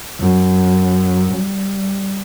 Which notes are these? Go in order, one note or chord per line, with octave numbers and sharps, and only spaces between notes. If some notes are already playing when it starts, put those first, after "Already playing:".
F#2
G3